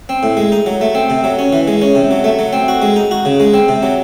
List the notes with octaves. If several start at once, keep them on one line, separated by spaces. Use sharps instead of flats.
C4
A2
G#3
D#4
F#3
A3
C4
C3
F#3
C#4
E3
G#3
C#4
C3
F#3
A3
F#3
C4
F#4
G#3
D#4
F#4
C#3
G#3
C4
C3
F#3